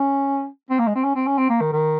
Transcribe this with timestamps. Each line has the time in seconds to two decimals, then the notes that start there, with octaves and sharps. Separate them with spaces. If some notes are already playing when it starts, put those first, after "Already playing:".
Already playing: C#4
0.70 C4
0.79 A#3
0.88 G#3
0.95 C4
1.04 C#4
1.16 C4
1.27 C#4
1.38 C4
1.49 A#3
1.61 D#3
1.72 D#3